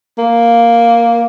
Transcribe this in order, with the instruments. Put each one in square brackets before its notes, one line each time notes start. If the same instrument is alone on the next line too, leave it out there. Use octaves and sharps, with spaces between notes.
[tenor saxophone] A#3